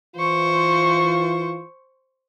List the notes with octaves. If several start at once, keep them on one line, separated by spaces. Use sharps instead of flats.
E3 F4 C5 C#6